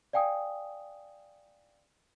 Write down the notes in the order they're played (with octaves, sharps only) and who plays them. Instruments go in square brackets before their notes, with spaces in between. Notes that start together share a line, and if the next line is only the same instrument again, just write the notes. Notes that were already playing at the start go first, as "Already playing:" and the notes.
[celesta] D5 F5 G5 G#5 D#6